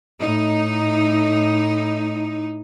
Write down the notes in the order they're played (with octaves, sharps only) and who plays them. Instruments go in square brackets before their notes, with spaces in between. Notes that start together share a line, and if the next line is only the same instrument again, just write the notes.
[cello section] A2 D#4